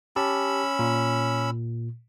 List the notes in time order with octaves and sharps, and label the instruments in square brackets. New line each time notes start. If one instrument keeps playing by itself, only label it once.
[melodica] C#4 B5 E6 [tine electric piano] G4 A5
[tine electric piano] A#2